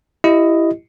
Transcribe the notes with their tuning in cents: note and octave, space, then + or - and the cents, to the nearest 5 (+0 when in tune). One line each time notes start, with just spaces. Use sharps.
E4 +10 G4 -10 D#5 +0